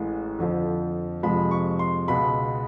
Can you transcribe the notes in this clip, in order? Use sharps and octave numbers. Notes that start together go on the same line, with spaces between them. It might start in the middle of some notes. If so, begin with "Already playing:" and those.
Already playing: A1 A2 E3 G#3
F2 D3 F3
F2 C3 F3 G#3 B5
C#6
C6
C#2 B2 G#3 B5